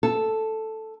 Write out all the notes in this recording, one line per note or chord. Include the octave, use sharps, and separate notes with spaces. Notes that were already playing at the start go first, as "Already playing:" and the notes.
A4